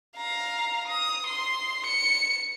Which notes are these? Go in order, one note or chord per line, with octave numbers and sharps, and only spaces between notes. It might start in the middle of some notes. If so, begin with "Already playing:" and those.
F5 A#5
D#6
C6
C#7